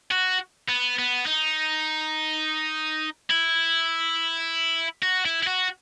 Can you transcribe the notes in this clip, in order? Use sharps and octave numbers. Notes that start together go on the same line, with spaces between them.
F#4
B3
B3
D#4
E4
F#4
E4
E4
F#4